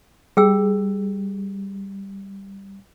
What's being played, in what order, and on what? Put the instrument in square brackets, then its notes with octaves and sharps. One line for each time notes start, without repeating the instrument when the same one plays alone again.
[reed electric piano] G3 [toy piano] G#4 G5 E6